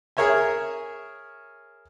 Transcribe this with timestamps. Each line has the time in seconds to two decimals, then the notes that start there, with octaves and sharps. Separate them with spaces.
0.17 G#4 A#4 C#5 E5 G#5